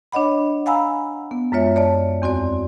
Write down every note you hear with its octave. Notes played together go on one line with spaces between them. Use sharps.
D4 C#5 D#5 F#5 B5
F5 F#5 G#5 A#5 B5 E6
B3
F#2 G#3 F4 C#5 E5
C#5 D5 A5
E2 C4 F#4 D5